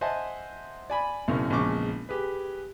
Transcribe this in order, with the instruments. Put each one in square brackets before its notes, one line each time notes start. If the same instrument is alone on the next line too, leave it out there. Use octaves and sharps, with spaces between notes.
[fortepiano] C5 D#5 E5 F#5 G#5 A5
D5 G#5 B5
B1 F#2 A2 C#3 C4 A#4
A#1 E2 C#3 G#3 C#6 D6
G4 G#4 B4